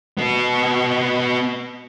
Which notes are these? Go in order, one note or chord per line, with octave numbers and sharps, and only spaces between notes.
B3 F#4